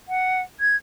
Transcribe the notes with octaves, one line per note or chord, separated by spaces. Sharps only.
F#5
G#6